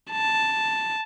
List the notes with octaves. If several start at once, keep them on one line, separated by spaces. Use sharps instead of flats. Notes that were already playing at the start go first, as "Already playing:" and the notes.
A5